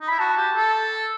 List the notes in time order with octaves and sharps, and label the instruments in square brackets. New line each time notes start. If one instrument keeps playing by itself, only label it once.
[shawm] D#4
[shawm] E4 [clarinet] B5
[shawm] F#4 [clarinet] A5
[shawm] G4
A4